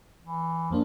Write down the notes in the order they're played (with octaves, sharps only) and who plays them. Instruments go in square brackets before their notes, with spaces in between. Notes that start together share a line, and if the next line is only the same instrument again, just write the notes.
[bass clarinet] E3
[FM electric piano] F2 A#3 D4 [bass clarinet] F3